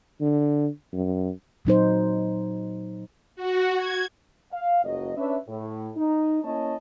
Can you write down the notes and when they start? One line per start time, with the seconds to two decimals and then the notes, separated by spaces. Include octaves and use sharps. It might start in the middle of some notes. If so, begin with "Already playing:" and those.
0.21 D3
0.93 F#2
1.65 A#2 F#3 D#4 C5
3.36 F#4
3.76 G#6
4.52 F5
4.84 F#1 C#2 F#3 D#5
5.17 C#4 D4 B4 C#5 E5
5.48 A2
5.97 D#4
6.44 A#3 C#4 E4 C#5 D#5 A5